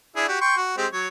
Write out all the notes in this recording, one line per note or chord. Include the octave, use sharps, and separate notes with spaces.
D4 E4 G#4
F#4 G4
G5 C6 C#6
F#4
G#3 C4 G4
F#3 C#5